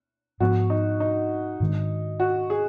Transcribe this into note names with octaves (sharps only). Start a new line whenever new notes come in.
G#2 F3 B3 F#4
D#4
D#4
G#2 D#3 G#3 D4
F#4
G#4